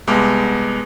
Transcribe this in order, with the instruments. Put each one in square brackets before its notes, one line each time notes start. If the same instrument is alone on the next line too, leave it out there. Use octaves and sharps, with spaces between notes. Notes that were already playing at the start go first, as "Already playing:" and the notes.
[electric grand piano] C2 G#3 B3 D6